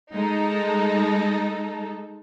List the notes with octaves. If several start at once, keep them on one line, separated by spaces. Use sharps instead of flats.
G#3 D#4 A4